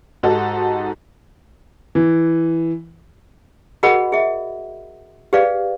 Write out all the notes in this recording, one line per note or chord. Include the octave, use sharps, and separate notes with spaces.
G#2 D#4 F#4 G4 A4
E3
F#4 G#4 A#4 D#5 F#5 B5
G#4 E5
G4 G#4 B4 D5 F5